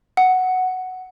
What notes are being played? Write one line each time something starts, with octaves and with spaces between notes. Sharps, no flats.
F#5